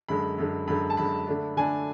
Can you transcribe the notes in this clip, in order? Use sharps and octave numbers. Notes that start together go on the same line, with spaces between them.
F#2 D3 G#3 B5
F#2 D3 G#3
F#2 D3 G#3 B5
A5
F#2 D3 G#3 B5
D3 A3 D4
D3 A3 D4 G#5